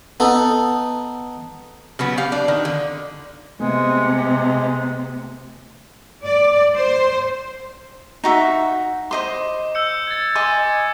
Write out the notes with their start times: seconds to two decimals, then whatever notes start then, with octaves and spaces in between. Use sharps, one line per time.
0.20 B3 D#4 A4
1.99 C#3 F#3 B3
2.18 G4 F5
2.32 D4
2.48 D#3
2.65 D3
3.60 C3 G#3 A3 B3
6.25 D5
6.76 C5
8.24 D#4 F#4 E5
9.11 C5 D#5 C6 D6
9.75 E6 G6 C#7
10.07 G#6 A6
10.35 D#5 G#5 C6 D6